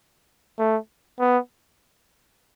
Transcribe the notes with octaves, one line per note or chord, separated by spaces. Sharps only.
A3
B3